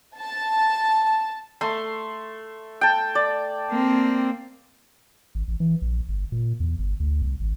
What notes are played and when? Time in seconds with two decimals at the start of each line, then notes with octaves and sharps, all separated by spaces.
0.20 A5
1.61 A3 C6
2.81 G5 A5
3.15 D5
3.71 A#3 C4
5.35 G#1
5.48 A1
5.60 E3
5.82 A#1
6.08 G1
6.32 A#2
6.60 E2
6.79 G1
7.00 D2
7.22 C2
7.40 G#1